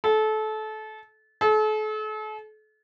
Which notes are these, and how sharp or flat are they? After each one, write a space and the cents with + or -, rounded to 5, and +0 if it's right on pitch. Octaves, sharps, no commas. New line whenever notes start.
A4 -25
A4 -40